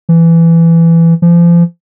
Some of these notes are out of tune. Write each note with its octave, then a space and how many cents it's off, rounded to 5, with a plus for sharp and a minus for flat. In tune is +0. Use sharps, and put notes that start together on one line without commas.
E3 +15
F3 -35